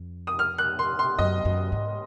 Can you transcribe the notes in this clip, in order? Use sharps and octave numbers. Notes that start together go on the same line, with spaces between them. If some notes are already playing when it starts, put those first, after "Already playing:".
Already playing: F2
D#6
F6
F#6
C6
C6
F#2 D#5
F#2
G#2